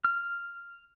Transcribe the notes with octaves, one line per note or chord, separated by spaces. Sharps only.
F6